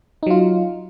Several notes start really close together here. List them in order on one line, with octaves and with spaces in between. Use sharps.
D#4 F#3 F4